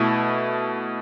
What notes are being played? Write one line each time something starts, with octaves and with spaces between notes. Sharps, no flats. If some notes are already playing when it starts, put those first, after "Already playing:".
Already playing: B2 A3 E4